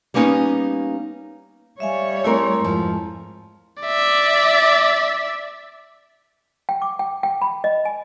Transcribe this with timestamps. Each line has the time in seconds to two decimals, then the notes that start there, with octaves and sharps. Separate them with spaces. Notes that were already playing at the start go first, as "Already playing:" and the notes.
0.14 G3 A#3 B3 C#4 D#4
1.80 G3 C#5 E5 F5 G#5
2.24 A3 C4 E4 A#4 G#5 C6
2.64 F2 G#2 F3
3.82 D5 E5
6.69 G5
6.82 D6
6.99 G5
7.23 G5
7.42 B5
7.64 D#5
7.85 G#5